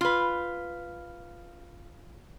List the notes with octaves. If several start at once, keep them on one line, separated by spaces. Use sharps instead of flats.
F4 B4